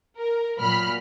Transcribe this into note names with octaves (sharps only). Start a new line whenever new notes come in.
A#4
A#2 F#3 B5 F6